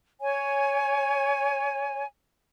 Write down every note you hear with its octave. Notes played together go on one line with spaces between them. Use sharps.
C#5 G#5